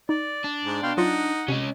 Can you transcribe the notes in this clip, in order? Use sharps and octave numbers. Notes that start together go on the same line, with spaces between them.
D#4 D5
D4
G#2
B2 F5 G5 C6
F#3 D#4 F4 F#5 A6
C3 C#4 C#5 D#5